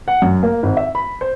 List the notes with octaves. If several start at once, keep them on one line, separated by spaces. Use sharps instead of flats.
F#5
F#2
A#3
G#1
E5
B5
C5